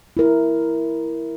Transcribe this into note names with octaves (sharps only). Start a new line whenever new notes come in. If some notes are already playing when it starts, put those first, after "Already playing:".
E4 A#4